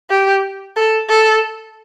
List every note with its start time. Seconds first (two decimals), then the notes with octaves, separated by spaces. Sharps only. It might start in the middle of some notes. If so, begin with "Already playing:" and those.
0.10 G4
0.77 A4
1.09 A4